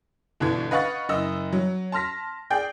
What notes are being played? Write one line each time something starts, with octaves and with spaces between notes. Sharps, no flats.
G1 B2 D3 E3 D4 G#6
B4 D#5 F5 F#5 C#6 A6
F#1 D#5 E6
F#3
A5 C6 F6 A#6 B6
G#4 D5 G5 G6